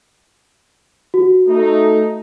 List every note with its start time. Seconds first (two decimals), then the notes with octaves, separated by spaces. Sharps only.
1.14 F#4
1.49 A3 D#4